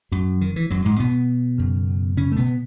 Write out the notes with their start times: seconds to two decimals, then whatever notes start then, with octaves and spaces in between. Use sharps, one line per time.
0.12 F#2 F#3
0.41 D#3
0.56 E3
0.70 F#2 F#3
0.85 G#2 G#3
1.00 B2 B3
1.58 F#2 C#3
2.17 C#3 C#4
2.32 A3
2.37 B2 B3